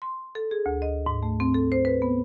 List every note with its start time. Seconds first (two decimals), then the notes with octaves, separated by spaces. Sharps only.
0.02 C6
0.35 A4
0.51 G#4
0.66 D2
0.82 D#5
1.06 G#2
1.23 A3
1.40 C4
1.54 A4
1.72 C5
1.85 B4
2.02 B3